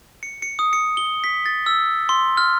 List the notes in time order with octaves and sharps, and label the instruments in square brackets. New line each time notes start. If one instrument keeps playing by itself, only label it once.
[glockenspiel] C#7
C#7
D#6
C#7
G7
B6
A6
E6
C6
F6